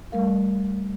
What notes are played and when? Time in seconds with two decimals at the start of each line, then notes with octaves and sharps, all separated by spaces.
0.12 G3 A3 A#4 F5